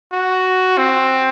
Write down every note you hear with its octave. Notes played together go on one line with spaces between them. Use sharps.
F#4
C4